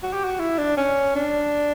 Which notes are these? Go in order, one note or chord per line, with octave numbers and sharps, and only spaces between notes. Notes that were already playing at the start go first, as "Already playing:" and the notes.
F#4
G4
F#4
E4
D4
C#4
D4